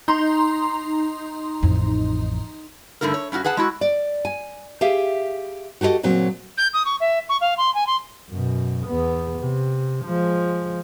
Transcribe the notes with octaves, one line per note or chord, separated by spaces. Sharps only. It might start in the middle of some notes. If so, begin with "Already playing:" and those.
D#4 A#5 C6
A1 F2
G2 D3 A3 D#4 A#4
C#5
G2 C#4 D#4 F#4
G#4 B4 F#5 A5
G#3 E4 F#4
D5
G#5
G4 G#4 E5 F5
F#4 G4 A4 C5 D#5
A#2 C#3 F#3 C4
G6
D#6
C#6
E5
C#6
F5
C6
G#5
C6
F#2 B2
E2 B3
C3
F3 G#3